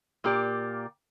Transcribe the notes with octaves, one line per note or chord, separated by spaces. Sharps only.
A#2 A#3 G4 D5